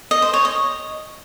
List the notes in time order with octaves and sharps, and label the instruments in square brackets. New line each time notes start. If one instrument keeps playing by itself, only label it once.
[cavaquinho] D#5
C5
C#5
D#5